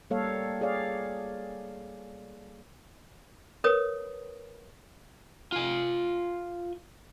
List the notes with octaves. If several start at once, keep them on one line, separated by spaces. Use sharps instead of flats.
G3 A#3 A4 C#5 F5
G#4 C#5 D5 F5
A#4 B4 C#5 D#6
F4 G#5